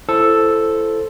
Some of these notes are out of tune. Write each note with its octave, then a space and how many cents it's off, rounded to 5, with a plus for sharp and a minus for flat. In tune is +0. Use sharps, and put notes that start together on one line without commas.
E4 +25 A4 +0 C5 +0